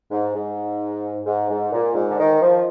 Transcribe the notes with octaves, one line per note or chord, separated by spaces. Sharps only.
G#2
G#2
G#2
G#2
A#2
G#2
D3
D#3
F3